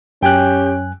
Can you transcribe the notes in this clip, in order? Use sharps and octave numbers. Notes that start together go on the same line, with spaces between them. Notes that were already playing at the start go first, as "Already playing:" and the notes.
F#2 C#4 G4 G5 G#5 F#6